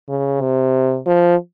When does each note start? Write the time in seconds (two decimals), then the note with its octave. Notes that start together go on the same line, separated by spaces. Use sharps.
0.09 C#3
0.41 C3
1.06 F3